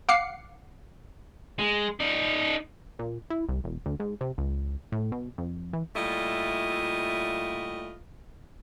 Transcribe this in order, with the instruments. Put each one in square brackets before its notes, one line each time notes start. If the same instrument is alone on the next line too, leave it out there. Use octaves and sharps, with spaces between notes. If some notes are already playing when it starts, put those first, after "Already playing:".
[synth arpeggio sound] F5 F#5 D6 C7 C#7
[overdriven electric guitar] G#3
D#4 D5
[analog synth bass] A#2
E4
C2
E1
D2
G#2
C3
C#2
A2
B2
F2
E3
[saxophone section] A#2 G3 A3 E4 F4 D#5